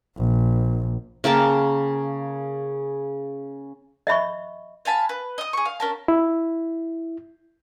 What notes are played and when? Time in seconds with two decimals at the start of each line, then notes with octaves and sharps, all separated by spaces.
0.17 A#1
1.24 C#3 A#3 G5 A5
4.07 D#5 E5 B5 C#6
4.85 F5 G#5 A5 B5
5.09 B4
5.38 D#5 D#6
5.53 G#4 C#6
5.65 F5
5.80 C#4 A#4 A5
6.08 E4